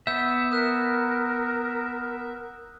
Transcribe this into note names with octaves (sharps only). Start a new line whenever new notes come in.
B3 E5 E6 G6
A#4 D#6 F#6 E7